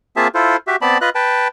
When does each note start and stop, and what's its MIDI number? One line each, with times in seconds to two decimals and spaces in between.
0.16 0.28 58
0.16 0.28 60
0.16 0.28 65
0.16 0.28 68
0.16 0.28 76
0.16 0.28 81
0.35 0.57 64
0.35 0.57 65
0.35 0.57 69
0.35 0.57 72
0.67 0.76 66
0.67 0.76 67
0.67 0.76 76
0.82 0.98 59
0.82 0.98 60
0.82 0.98 74
0.82 0.98 81
0.82 0.98 83
1.01 1.10 65
1.01 1.10 71
1.01 1.10 75
1.01 1.10 90
1.15 1.48 71
1.15 1.48 79
1.15 1.48 81